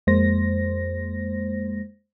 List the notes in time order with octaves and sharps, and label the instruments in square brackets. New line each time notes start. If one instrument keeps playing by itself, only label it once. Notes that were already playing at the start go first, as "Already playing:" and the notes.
[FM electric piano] F2 G#3 A#3 C5 A#6